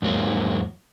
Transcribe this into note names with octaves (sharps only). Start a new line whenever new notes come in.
E2 G#2 F#3 A#3